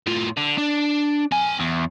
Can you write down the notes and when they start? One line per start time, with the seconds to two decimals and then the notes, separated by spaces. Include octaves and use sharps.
0.07 A2 F4
0.37 D3
0.58 D4
1.32 C4 G#5
1.60 E2